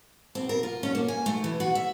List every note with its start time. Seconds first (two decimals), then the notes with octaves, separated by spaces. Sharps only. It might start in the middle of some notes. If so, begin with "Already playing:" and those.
0.35 C4
0.49 A#4
0.63 F4
0.83 C#4
0.95 A#3
1.08 G#5
1.26 A3
1.44 E3
1.60 F#4
1.75 E5